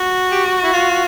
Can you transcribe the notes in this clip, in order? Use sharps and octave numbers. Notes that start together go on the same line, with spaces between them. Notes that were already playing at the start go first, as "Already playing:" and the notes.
Already playing: F#4
G4
E4
F4